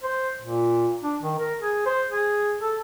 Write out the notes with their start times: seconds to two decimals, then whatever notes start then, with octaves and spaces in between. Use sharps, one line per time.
0.03 C5
0.42 A#2
1.03 D4
1.22 D#3
1.39 A#4
1.61 G#4
1.86 C5
2.11 G#4
2.61 A4